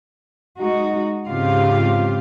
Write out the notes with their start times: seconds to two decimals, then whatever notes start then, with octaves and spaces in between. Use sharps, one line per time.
0.58 G#3 D#4 F#4
1.27 G#2 C#3 C4 F4 G4 F5